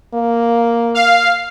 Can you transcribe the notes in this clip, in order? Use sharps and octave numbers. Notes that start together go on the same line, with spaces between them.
A#3
F5